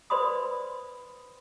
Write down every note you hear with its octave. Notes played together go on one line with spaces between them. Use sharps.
B4 C5 D5 B5 C6 D#6